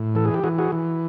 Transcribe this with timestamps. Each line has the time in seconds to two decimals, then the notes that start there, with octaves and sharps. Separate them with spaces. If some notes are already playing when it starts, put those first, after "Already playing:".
Already playing: A2
0.15 E3 A4
0.25 G#4
0.34 G4
0.44 E3 F#4 G#4
0.58 F#4 G#4
0.72 E3